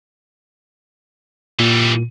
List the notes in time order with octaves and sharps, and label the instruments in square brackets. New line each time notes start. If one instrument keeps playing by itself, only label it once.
[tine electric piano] A#2 [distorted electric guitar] E3 G3